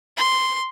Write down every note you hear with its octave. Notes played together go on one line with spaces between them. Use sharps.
C6